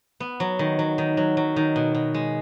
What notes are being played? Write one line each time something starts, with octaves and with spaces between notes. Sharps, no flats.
B3
F#3
D#3
F#3
D#3
F#3
F#3
D#3
B2
B2
G#3